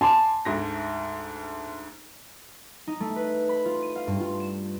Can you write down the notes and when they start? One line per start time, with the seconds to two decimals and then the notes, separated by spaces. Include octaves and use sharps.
0.01 G#5 A5 C6 D6
0.45 D2 G#2 A#6
2.87 D#4
3.00 A3
3.16 B4
3.49 B5
3.65 F4
3.83 D#7
3.96 F5
4.07 G2
4.20 F4
4.40 E7